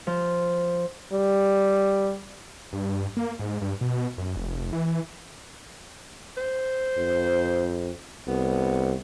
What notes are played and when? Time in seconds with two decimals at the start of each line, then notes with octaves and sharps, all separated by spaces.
0.07 F3
1.13 G3
2.73 G2
3.17 A#3
3.39 G#2
3.62 G2
3.81 B2
4.18 F#2
4.36 F1
4.73 E3
6.37 C5
6.98 F2
8.28 C2 B3